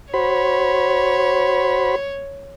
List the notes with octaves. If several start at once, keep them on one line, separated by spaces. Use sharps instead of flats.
F#4 C5 C#5 B5